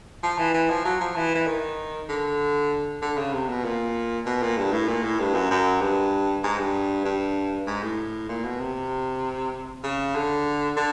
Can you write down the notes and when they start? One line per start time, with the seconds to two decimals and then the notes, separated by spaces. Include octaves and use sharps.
0.23 F3
0.39 E3
0.54 E3
0.70 F3
0.85 F#3
1.01 F3
1.16 E3
1.35 E3
1.47 D#3
2.09 D3
3.02 D3
3.18 C#3
3.33 C3
3.49 B2
3.64 A#2
4.26 B2
4.42 A#2
4.57 G2
4.73 A2
4.88 A#2
5.04 A2
5.19 G2
5.34 F#2
5.51 F#2
5.81 G2
6.44 G#2
6.58 G2
7.05 G2
7.67 G#2
7.83 A2
8.29 A#2
8.44 B2
8.60 C3
9.84 C#3
10.15 D3
10.77 D3